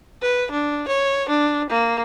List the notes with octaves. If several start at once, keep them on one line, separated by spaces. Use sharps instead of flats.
B4
D4
C#5
D4
A#3